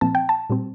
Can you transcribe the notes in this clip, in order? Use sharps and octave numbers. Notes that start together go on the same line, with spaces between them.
A#2 F3 C4 A5
G5
A5
A#2 G3 C4